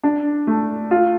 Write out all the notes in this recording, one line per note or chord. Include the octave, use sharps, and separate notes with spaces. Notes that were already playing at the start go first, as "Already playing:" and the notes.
D4
A3
F4